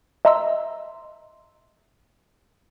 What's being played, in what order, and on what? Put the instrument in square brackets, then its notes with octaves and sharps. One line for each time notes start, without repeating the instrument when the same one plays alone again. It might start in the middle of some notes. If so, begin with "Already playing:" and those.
[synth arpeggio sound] D#5 E5 A#5 C6 E6